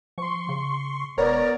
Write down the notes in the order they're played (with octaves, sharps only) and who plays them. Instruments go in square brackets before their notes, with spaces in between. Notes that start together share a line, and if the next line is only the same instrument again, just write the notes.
[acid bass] F3 [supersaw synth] C6 C#6
[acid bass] C#3
[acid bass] E1 [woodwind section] B3 D5 [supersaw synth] A#4 C#5 A#5